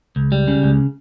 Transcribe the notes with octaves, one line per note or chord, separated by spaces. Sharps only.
C#2
G3
C#3
C#2